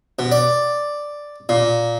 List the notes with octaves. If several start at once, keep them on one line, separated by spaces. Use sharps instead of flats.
B2
D5
A#2